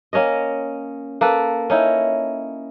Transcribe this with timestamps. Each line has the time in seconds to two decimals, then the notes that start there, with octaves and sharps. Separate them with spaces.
0.13 A#3 C#4 C#5 D#5
1.21 A#3 A4 B4
1.70 C#4 D#4 E4